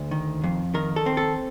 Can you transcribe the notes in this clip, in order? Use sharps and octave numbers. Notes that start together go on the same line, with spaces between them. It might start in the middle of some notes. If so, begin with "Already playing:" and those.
Already playing: D2
D#3
F2
D#3 A#4
A4
C4
A4